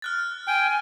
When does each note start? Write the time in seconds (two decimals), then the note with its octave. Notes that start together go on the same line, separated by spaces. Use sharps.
0.02 F6 F#6 A6
0.48 G5 G#5